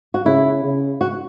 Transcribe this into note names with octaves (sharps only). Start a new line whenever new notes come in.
F#4
C#3 E4
C#3
F#4